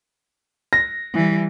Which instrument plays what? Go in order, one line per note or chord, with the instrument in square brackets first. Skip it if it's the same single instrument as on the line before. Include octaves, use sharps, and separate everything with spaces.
[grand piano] A#6
[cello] E3 G3